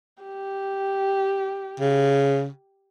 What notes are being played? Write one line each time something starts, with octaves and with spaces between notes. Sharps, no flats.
G4
C#3